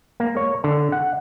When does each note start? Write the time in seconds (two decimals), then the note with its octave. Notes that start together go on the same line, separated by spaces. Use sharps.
0.20 A#3
0.37 C#5
0.64 D3
0.92 F#5